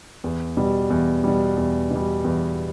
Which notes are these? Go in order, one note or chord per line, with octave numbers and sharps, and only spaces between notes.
E2
B2 G3
E2
B2 G3
E2
B2 G3
E2